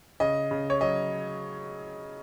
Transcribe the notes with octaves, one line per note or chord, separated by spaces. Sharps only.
C#3 D#5
C#3
C#5
F#3 D#5